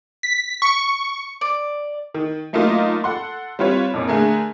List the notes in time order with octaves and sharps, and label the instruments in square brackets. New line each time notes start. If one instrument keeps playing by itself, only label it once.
[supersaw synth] B6
C#6
[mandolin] D5
[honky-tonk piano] D#3
F#3 A3 A#3 D#4 F4 D#5
A4 F#5 C6
G3 C4 F4 B4 C#5
F2 A#2 C#4
D3 A3 G#4 A#4